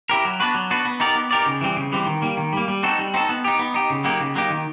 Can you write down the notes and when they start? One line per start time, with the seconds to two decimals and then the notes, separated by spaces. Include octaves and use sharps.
0.10 E4 G4 A#4
0.25 F#3
0.40 B3 D4 F#4 B4
0.54 F#3
0.71 B3 D4 F#4 B4
0.85 B3
1.00 D#4 G4 A#4 D5
1.15 B3
1.31 D#4 G4 A#4 D5
1.46 C#3
1.61 E3 G3 C4
1.77 C#3
1.92 E3 G3 C4
2.06 D#3
2.22 G3 A#3
2.37 D#3
2.53 G3 A#3
2.68 G3
2.83 C4 D#4 F#4 A4
2.99 G3
3.14 C4 D#4 F#4 A4
3.29 B3
3.44 D#4 G4
3.59 B3
3.74 D#4 G4
3.90 C#3
4.04 F#3 A#3 D#4 G4
4.20 C#3
4.35 F#3 A#3 D#4 G4
4.50 D#3